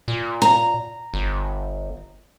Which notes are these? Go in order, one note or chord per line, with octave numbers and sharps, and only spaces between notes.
A#2
A#5
G1